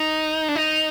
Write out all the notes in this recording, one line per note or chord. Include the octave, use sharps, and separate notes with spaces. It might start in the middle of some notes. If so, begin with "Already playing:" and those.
Already playing: D#4
D4
D#4